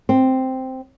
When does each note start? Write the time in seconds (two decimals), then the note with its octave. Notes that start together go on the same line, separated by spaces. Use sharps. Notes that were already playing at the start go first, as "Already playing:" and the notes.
0.09 C4